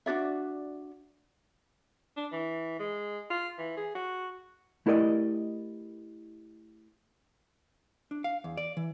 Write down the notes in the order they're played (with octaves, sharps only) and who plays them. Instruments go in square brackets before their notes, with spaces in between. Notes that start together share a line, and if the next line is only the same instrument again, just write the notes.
[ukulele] D4 F#4 D5 E5
[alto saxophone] D4
E3
G#3
F4
E3
G#4
F#4
[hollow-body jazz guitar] A3 E4 G4 A#4 D5 D#5
D4
F5
E2
D5
E3